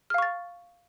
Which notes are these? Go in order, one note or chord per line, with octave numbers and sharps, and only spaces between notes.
F5 C#6 F6 A6